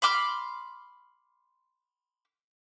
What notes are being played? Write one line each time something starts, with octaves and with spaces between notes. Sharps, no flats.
B5 C6 D6 F6